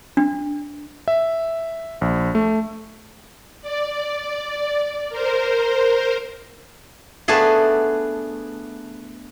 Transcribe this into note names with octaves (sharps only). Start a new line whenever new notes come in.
D4
E5
A#1
A3
D5
A#4 C5
A3 B3 D4 G#4 A4